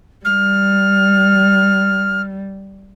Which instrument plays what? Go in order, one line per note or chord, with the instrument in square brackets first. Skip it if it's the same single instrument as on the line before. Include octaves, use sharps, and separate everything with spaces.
[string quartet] G3 [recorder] F6